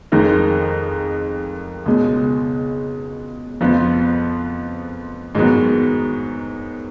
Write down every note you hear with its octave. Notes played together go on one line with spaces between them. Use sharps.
F2 D#3 G#3 D#4 A#4
C#2 B2 G#3
F2 F3 B3
G#2 D#3 F#3 B3